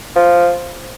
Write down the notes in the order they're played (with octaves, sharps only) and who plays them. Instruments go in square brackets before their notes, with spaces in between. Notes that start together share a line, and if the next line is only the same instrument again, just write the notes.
[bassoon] F3